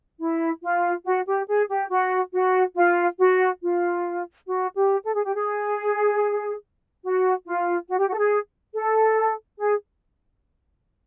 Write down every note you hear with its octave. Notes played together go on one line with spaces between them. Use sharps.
E4
F4
F#4
G4
G#4
G4
F#4
F#4
F4
F#4
F4
F#4
G4
A4
G#4
G4
G#4
F#4
F4
F#4
G4
F#4
A4
G#4
A4
G#4